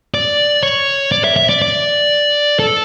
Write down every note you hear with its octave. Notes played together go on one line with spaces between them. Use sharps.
D5
C#5
D5
E5
E5
D5
D5
A4